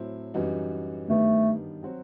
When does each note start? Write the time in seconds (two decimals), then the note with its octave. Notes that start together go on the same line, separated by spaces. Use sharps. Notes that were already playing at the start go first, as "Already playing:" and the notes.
Already playing: A2 F#3 C4 E4
0.34 F#2 E3 G3 D#4 F#4
1.08 G2 D#3 G3 A3 B3
1.83 F#3 C4 F#4